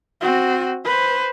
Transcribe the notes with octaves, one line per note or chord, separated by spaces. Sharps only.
C4 F#4
B4 C5